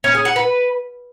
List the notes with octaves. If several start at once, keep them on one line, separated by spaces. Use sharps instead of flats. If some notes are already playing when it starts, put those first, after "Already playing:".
C#4
G#4
F#5
B4